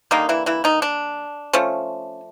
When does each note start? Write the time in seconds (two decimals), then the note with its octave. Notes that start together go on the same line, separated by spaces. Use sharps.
0.11 D3 D#3 G3 A#3 D#4
0.29 E3 E4
0.46 E3 E4
0.64 D#3 D#4
0.82 D4
1.53 F3 A3 C#4